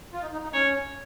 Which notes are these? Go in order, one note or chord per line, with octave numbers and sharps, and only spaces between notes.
F4
D#4
D#4
D#4
C#4 C#5